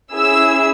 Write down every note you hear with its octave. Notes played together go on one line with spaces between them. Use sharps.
C#4 E4 G#4 E6